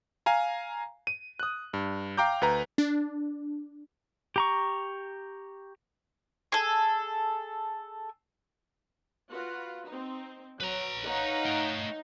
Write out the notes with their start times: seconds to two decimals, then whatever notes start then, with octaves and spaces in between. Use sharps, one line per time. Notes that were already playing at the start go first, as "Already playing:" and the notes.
0.26 F5 G#5 A#5
1.07 D#7
1.40 D#6 F#6
1.73 G2
2.17 F5 G5 A#5 D6 G6
2.41 D2 B4 A#5
2.78 D4
4.36 G4 A#5 C#6
6.52 G#4 A4
9.32 F4 F#4 B4
9.86 C4 D#4
10.60 F#3 B4 A#5
11.07 D#4 C#5 F5 F#5
11.45 A3 G5